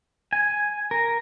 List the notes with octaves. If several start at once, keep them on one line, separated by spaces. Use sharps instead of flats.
G#5
A#4